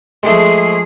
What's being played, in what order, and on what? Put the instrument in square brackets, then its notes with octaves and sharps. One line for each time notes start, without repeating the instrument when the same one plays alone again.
[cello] F3 G#4 [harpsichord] G#3 A3